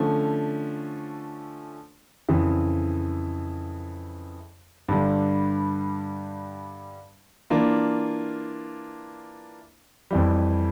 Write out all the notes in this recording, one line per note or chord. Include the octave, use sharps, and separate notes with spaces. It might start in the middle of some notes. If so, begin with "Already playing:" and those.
Already playing: D3 F3 A3 C#4
F2 C#3 E3
G2 D3 G3
E3 A#3 D4 F4
F2 E3 G3